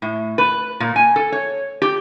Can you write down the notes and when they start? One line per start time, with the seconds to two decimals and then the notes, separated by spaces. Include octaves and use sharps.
0.02 A2
0.38 B4
0.80 A#2
0.96 G#5
1.16 A4
1.32 C#5
1.82 G4